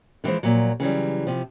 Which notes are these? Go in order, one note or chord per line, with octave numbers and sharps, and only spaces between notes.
D3 E3 F3 G#3 C5
A#2 F3 F#3
C#3 E3 F#3 G3
C3 F3